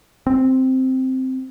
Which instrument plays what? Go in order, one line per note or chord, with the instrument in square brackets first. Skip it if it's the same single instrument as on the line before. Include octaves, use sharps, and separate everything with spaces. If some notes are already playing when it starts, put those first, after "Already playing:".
[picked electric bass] C4